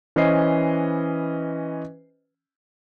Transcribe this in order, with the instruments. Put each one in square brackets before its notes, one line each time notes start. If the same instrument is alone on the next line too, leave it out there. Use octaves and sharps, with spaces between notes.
[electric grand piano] E3 C#4 B4 C5 D#5 C7